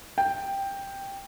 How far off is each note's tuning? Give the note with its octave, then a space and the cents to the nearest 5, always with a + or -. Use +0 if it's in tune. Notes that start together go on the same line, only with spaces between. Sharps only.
G5 +5